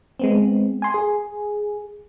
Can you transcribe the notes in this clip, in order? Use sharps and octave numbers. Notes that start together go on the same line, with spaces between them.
G#3 B3 C4
G#5 C6
G#4